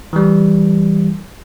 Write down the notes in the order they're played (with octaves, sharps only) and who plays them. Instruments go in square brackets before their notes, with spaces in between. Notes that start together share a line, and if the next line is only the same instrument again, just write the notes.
[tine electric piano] E3 G3